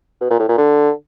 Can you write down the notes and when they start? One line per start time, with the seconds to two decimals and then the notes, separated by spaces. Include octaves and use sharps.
0.21 B2
0.30 A#2
0.39 A2
0.49 A#2
0.58 D3